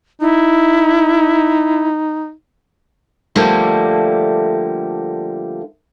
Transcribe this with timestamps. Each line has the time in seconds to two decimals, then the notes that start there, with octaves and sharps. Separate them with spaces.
0.21 D#4 E4
3.36 D3 F3 G3 A3 A#3